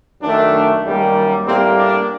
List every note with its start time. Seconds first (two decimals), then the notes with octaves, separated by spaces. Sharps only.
0.22 F#2 D#3 A3 D4
0.84 F#2 D#3 G3 A#3
1.47 A2 G3 A#3 C4
1.78 D4